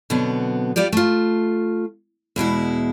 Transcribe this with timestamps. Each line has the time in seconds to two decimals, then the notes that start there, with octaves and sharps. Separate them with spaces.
0.10 B2 D3 F#3 B3 C4
0.76 G3 F4 G4 D5
0.93 A3 F4
2.36 E2 B2 G#3 E4